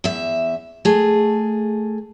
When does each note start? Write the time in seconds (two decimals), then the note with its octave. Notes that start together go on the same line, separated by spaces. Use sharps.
0.04 E2 E5
0.85 A3 G#4